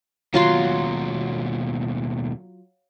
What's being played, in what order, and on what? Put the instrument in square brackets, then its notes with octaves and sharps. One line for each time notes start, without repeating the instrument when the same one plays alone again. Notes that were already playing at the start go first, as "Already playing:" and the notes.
[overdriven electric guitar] D#2 B2 [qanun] F#3 F4 C6